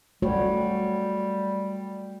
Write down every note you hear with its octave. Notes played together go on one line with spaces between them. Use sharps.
G3 A3 F#4 C#5